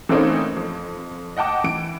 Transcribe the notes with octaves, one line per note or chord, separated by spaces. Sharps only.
E3 A3 A#3 C4 C#4 D#4
F2
D#5 F#5 G5 A5 D6
E3 D7